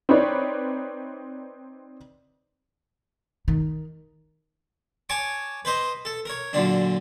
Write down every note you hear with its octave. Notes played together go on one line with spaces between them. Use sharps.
C4 D#4 B4 C#5 D5
D#3
C#5 G#5 A5 C#6 D6
B4 C5 D#5
A4
A#4 C#5
F#2 A#2 D3 D4